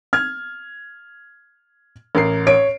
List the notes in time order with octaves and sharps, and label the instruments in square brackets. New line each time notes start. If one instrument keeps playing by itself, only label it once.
[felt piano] F6 G#6
[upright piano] A1 A#4 C7
[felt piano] C#5 D7